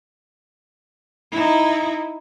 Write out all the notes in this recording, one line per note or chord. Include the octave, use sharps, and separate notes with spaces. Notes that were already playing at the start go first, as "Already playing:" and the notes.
D#4 E4